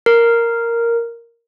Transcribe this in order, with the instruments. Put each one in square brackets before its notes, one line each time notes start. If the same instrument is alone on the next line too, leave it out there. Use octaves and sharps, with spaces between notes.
[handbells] A#4